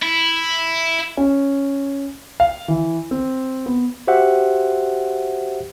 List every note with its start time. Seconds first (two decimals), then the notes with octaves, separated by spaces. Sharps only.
0.02 E4
1.17 C#4
2.40 F5
2.68 E3
3.11 C4
3.66 B3
4.07 F#4 G4 C5 E5 F#5